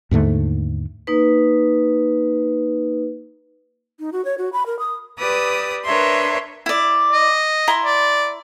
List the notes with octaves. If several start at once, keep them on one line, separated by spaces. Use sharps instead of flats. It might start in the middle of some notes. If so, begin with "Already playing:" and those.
D#2 G#2 D3 A3
A#3 D#4 B4
D#4
F#4
C#5
F#4
B5
A#4
D#6
G4 B4 D5 D#6 E6
D4 A#4 B4 C#5 E5 C6
E4 D5
D#5
E4 A#5 C6
D5